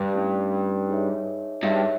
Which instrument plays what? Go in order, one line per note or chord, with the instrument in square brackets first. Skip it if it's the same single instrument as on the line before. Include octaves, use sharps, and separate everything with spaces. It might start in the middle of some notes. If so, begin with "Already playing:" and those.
Already playing: [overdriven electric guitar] G2
[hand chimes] A3 C#4 E4
D#4 G#4 C#5 E5
[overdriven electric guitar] G2 [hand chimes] D#4 G#4 C#5 E5